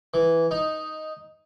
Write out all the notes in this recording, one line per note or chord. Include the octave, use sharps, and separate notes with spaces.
E3
D#4